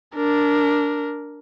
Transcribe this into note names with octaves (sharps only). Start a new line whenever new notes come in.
D4 A#4